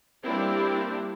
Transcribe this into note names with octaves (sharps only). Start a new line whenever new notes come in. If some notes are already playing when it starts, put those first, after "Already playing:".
G3 A#3 C4 D4 E4